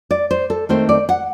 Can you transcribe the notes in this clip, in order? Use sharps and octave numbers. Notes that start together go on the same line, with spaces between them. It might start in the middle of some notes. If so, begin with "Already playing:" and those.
D5
C5
A4
D#3 A3 C4 C5
D5
F#5